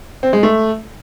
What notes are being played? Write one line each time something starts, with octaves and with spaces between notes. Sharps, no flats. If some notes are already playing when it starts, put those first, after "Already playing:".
C4
G#3
A3